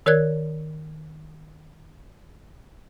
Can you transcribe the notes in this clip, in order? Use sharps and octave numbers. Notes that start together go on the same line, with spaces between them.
D#3 A#4 C#5 D5 F#6 G#6